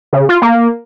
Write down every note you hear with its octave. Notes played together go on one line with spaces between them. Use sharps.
C#3
F4
A#3